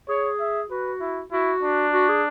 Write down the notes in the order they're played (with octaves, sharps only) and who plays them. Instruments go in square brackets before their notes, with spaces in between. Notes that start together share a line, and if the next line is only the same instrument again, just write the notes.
[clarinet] G#4 [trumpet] C#5
[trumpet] E5
[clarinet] F#4 [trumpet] B4
[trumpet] E4
[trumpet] E4 [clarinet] F#4
[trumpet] D4
[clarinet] F#4
G#4